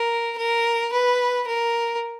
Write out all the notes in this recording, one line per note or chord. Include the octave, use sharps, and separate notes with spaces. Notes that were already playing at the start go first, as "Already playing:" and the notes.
Already playing: A#4
A#4
B4
A#4